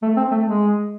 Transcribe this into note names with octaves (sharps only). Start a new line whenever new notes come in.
A3
C4
A3
G#3